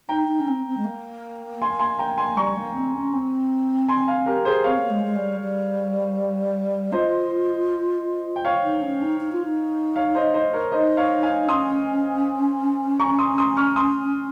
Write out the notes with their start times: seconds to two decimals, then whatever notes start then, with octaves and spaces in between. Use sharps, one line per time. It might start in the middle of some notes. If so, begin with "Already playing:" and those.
0.09 D#4 G5 A#5
0.28 D#4
0.40 C#4
0.48 C4
0.66 C4
0.77 G#3
0.84 A#3
1.62 G#5 C6
1.79 G#5 C6
1.99 G5 A#5
2.18 G#5 C6
2.36 G3 A#5 C#6
2.56 A#3
2.74 C4
2.94 C#4
3.13 C4
3.88 G#5 C6
4.08 F5 G#5
4.26 G4 A#4
4.45 G#4 C5
4.64 C4 C#5 F5
4.78 A#3
4.90 G#3
5.04 G#3
5.16 G3
5.40 G3
6.92 F4 C5 D#5
8.36 G5
8.45 C#5 F5
8.63 D#4
8.82 C#4
9.01 D#4
9.20 D#4
9.32 F4
9.44 D#4
9.96 C#5 F5
10.15 C5 D#5
10.34 C5 D#5
10.53 A#4 C#5
10.72 D#4 C5 D#5
10.97 C#5 F5
11.23 F5 G#5
11.48 C#4 C6 D#6
13.00 A#5 C#6
13.19 C6 D#6
13.38 C6 D#6
13.57 C#6 F6
13.76 C6 D#6